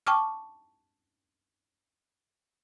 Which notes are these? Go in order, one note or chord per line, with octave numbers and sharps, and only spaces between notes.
G5 A5 C#6 D6 F6